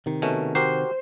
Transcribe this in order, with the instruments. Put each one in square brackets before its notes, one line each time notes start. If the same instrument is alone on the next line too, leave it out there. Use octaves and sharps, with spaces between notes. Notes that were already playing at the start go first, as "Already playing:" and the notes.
[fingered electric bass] C3 D#3
[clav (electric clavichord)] B2 A3 C#4
[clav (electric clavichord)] F#4 G4 A#4 [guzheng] C5